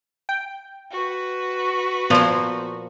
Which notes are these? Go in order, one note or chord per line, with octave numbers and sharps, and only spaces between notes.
G5
F#4 B4
A#2 F3 B3 C5